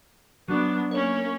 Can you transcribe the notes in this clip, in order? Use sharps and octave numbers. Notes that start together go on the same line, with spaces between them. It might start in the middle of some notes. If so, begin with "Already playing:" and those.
F#3 B3 D4
A#3 C#4 C#5